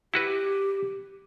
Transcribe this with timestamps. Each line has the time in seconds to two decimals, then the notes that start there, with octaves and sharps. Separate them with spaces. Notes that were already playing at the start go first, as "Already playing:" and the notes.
0.14 E4 F#4 G4 B4